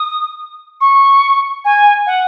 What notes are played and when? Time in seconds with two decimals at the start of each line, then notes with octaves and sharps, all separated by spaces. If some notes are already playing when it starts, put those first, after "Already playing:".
Already playing: D#6
0.81 C#6
1.65 G#5
2.07 F#5